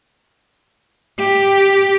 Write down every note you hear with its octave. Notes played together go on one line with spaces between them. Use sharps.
G4